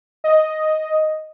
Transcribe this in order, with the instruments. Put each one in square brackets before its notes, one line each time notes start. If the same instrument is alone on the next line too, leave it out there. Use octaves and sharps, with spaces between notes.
[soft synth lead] D#5